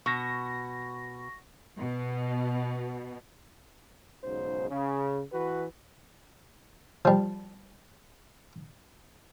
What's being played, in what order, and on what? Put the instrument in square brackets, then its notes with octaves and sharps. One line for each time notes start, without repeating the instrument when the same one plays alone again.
[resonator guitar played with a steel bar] B2 [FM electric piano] C#6 A#6
[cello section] B2
[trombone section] B1 G#2 C#3 C5
C#3
E3 F#4 B4
[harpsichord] F3 G3